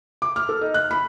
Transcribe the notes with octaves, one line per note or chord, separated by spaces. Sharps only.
D6
F6
A4
D#4
F#6
B5